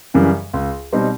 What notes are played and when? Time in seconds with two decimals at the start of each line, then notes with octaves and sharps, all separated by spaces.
0.14 F#2 C#3 E3 G3
0.53 C#2
0.92 B2 G3 C4 D#4